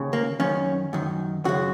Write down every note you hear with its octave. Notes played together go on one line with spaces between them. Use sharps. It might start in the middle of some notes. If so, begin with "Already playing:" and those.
Already playing: D#2 C#3
A#3
F#2 D#3 C#4
F#2 D#3
F#2 C#3 F#4